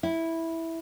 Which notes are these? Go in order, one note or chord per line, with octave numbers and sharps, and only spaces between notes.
E4